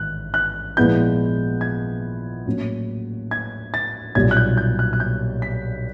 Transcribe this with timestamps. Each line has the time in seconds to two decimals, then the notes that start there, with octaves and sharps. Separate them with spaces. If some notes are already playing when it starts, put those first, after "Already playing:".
Already playing: A1 G#2 D#3 F#6
0.34 F#6
0.77 A#2 F3 G#3 B3 E4 G6
1.61 G#6
2.46 A2 F#3 A#3 C#4
3.31 G#6
3.74 A6
4.15 B1 A#2 G3 G#6
4.31 F#6
4.37 G6
4.57 G6
4.79 F#6
4.93 F#6
5.00 G6
5.42 B6